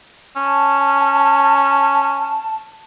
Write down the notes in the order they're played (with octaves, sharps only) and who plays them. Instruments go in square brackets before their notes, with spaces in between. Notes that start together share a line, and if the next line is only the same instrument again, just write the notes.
[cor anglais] C#4 [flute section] A5